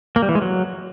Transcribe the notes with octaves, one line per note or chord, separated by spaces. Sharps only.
A#3
G3
E3
G#3
F#3